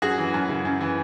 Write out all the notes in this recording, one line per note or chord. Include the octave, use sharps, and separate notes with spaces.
F#2 F#4 G#4
E3
F#2
C#3
F#2
E3